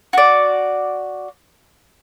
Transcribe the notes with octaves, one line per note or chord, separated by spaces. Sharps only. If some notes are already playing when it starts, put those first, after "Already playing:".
F#4 D5